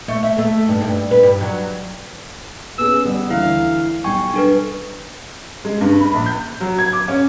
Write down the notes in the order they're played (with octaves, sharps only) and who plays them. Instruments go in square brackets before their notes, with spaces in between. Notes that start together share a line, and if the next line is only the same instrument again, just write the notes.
[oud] A3
E5
A3
G2
G2
B4
G2
F#3
[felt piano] B3 C#4 G#4 [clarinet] E6
[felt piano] G3 D5 [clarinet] B3
[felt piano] D2 E3 [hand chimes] E4 [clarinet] F5
[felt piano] B1 G3 [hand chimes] G5 C#6 [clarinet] G#5
[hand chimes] D4 A4 B4
[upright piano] G#3
G2
B5
A#1
G6
F#3
G#6
D6
C#4